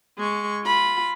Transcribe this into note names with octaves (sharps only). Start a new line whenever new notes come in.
G#3 C#6
F4 B5